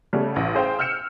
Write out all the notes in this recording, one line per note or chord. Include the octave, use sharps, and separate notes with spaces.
C#3 G3 A3 B3 C#4
A1
G#4 C5 F5 G5
E6 F6 G6 C#7 E7